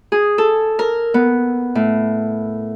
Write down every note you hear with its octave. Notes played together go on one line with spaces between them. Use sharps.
G#4
A4
A#4
B3
A2